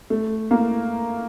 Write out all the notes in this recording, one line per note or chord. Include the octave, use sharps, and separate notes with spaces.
A3
A#3